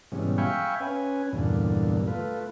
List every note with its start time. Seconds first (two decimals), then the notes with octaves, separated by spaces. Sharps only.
0.12 G#2 B2 E3 G3 C#4
0.38 E5 F5 G5 G#5 B5 C#6
0.80 C#4 B4 G#5
1.33 E2 G2 A#2 D3
2.07 A3 F4 B4